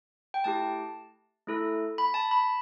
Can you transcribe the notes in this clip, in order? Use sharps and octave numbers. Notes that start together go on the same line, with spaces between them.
G5
A3 E4 G4 A5
A3 E4 A4
B5
A5
B5